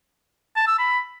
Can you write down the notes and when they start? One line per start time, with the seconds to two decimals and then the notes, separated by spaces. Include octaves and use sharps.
0.56 A5
0.68 E6
0.79 B5